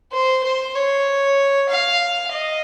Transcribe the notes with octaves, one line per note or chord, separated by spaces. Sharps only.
C5
C5
C#5
F5
D#5